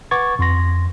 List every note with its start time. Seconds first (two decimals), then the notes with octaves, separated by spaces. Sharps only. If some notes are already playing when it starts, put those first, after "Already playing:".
0.11 B4 F#5 C#6 D6 G#6 A6
0.39 F2 C6 A#6